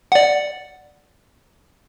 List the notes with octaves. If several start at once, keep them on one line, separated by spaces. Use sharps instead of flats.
D5 F#5